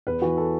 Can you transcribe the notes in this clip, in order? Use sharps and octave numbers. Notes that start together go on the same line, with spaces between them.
E2 B4
E3 F#4
A4